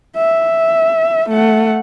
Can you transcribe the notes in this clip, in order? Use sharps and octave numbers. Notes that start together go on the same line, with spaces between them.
E5
A3 F#5